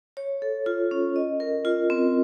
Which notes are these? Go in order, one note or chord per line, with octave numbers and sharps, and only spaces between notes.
C#5
A4
F4
C#4
D#5
A#4
F4
C4